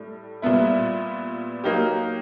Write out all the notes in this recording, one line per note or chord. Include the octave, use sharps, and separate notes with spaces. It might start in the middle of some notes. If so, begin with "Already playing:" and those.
Already playing: A2 G3
A#2 G3 B3 E4
F#3 A#3 D#4 G4